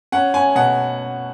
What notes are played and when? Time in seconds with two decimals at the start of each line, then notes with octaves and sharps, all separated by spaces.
0.12 C#4 F#5
0.34 C#4 G#5
0.55 B2 F#5